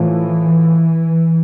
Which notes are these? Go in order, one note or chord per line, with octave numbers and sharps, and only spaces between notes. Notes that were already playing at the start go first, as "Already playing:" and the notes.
Already playing: A2 E3 F3 A3